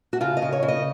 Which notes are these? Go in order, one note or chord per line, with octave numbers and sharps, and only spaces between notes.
F#4
C#3 F4
D#5
C#3
C#5
C#3
D#5